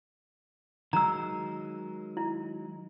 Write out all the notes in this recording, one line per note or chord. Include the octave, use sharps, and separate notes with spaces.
D#3 F#3 G#3 A#5 E6
E4